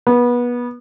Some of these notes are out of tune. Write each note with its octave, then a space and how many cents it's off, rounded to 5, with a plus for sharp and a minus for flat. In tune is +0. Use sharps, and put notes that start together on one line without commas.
B3 -25